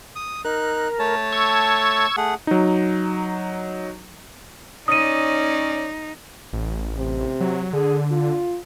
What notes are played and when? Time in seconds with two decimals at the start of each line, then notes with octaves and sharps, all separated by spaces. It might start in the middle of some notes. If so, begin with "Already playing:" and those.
0.16 D#6
0.45 D#4 A#4 F#6
0.99 A3 C#5 A5
1.32 C#6 E6 G#6
2.17 A3 G#4 F#5
2.47 F#3 D#4
4.88 C#4 D#4 D5 D#6 D#7
6.53 A1
6.98 C3
7.41 F#3
7.73 D3 G#4
8.11 F4